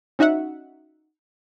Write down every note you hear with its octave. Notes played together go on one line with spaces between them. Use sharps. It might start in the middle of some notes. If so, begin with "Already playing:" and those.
C#4 D#4 F#4 E5 F#5